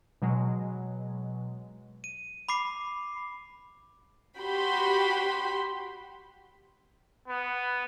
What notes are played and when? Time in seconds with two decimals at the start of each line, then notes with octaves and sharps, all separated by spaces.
0.22 B2 F#3 G#3
2.04 D#7
2.49 B5 D6 C7
4.39 F#4 G4 B5 C6
7.29 B3